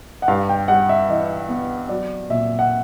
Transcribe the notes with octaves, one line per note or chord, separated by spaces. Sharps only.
F#5
G2 F5
G5
G3 F#5
E5
E3 D#5
B3
F#3 D5
A#2 E5
F#5